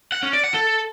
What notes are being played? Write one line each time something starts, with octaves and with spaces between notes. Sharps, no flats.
F#5
C#4
D5
F#5
A4